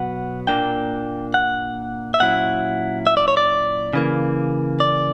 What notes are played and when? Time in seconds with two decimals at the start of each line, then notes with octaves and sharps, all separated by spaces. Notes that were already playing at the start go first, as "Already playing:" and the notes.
Already playing: B2 F#3 B3 F#5
0.47 A#2 A#3 D4 G5
1.34 F#5
2.14 E5
2.20 A#2 F#3 C#4 E4 F#5
3.07 E5
3.17 D5
3.28 C#5
3.37 D5
3.93 C#3 E3 A#3
4.80 D5